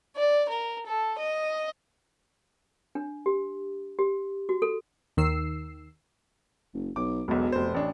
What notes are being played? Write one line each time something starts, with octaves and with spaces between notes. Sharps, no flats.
D5
A#4
A4
D#5
D4
G4
G4
F#4
A4
D#2 D#3 E6 C7
F#1
B1 D6
E1 B1 B2
F1 C5
A1 D4